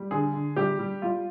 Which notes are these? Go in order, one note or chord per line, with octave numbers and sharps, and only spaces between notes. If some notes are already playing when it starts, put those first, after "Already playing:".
Already playing: G3
D3 G#4
D3
G3 G4
G3
G3 F4